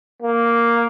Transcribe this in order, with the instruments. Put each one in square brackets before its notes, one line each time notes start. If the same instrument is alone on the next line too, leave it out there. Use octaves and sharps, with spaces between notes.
[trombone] A#3